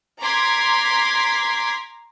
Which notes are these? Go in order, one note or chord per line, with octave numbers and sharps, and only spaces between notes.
A#5 C6 D6 G#6 B6